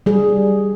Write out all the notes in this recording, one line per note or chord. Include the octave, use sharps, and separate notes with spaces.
G3 G#4